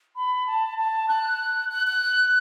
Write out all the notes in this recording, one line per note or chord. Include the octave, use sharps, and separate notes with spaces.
B5
A5
A5
F#6
F#6
F#6